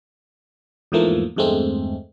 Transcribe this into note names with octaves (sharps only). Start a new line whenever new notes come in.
E2 G#2 E3 F3 A3 A#3
E2 G2 G#3 A3 C4